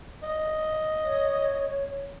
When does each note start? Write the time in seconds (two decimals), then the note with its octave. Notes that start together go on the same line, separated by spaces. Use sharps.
0.23 D#5
1.04 C#5